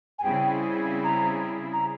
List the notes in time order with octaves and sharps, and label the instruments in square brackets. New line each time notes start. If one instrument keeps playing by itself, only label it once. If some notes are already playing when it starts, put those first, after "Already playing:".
[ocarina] G#5
[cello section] C#3 G3 C4 E4 G#4 [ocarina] G5
[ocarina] A#5
A#5